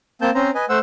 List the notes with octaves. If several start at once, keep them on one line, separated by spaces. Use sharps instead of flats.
A#3 C4 A5 G6
C4 C#4 C5 A#5
B4 D#5 G#5
A3 C5 F#5 E6